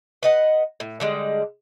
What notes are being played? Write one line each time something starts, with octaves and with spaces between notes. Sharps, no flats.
B4 D#5 F#5
A2
D3 G3 G#3